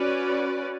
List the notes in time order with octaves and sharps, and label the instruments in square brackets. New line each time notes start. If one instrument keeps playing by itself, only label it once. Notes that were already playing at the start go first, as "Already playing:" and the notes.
Already playing: [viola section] C#4 F#4 B4 D5